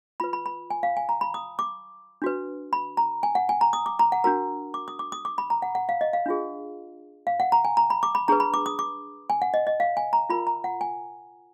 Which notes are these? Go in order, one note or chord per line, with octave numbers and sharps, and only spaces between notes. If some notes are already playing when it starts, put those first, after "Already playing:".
F4 B4 B5
B5
B5
G#5
F5
G#5
A#5
B5
D#6
D6
D4 F#4 B4
B5
A#5
G#5
F#5
G#5
A#5
D#6
D6
A#5
F#5
D4 F#4 A#4 A#5
D6
D#6
D6
D#6
D6
B5
A#5
F#5
F#5
F5
D#5
F5
D4 F4 G#4
F5
F#5
A#5
G#5
A#5
B5
D6
B5
D4 G#4 B4 A#5
B5
D6
D#6
D6
G#5
F#5
D#5
D#5
F5
G#5
A#5
F4 A#4 B5
A#5
F#5
G#5